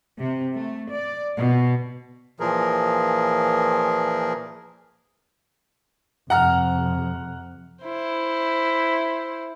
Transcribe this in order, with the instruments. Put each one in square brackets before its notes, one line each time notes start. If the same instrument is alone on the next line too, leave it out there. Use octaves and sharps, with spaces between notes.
[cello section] C3
A3
D5
B2
[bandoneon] A#2 E3 F3 G#4 A#4
[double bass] F2 C3 [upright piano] F#5 A#5 F6
[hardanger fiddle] E4 C5